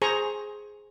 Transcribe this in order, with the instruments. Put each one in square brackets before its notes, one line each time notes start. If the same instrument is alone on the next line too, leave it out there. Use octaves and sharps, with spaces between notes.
[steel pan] G#4 C5 G#5 A#5 C#6